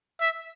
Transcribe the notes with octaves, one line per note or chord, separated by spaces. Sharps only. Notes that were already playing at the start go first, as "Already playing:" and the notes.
E5